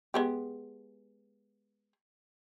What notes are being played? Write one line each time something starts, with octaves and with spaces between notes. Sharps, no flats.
G#3 B3 G4